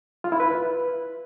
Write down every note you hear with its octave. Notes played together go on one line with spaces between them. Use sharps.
F4
E4
B4